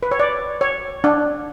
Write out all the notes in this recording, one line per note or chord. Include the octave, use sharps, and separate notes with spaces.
B4
C#5
D5
C#5
D4